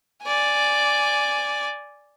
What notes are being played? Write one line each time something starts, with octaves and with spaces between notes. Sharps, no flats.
D5 G#5